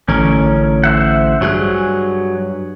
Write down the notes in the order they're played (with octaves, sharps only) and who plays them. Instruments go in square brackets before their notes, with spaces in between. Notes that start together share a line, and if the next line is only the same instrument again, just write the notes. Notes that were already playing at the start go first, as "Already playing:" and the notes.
[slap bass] A1 D3 [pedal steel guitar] C#4 A#4
[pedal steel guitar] C5 E5 F#5
[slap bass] G2 [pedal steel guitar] F#3 G#4 F#6